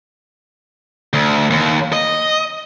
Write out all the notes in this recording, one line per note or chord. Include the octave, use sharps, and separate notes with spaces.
D2
D#2
D#5